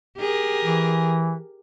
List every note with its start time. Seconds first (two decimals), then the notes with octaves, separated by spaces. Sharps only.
0.17 G4 G#4 A#4
0.64 E3